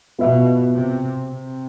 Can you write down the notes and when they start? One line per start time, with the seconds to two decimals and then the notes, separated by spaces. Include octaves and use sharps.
0.19 B2 B3 F4 B4 E5
0.72 C3
1.26 C3